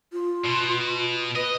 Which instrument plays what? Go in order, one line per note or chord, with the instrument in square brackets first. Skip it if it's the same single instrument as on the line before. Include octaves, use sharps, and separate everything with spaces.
[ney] F4
[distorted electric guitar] B2
[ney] B4 [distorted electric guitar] D#5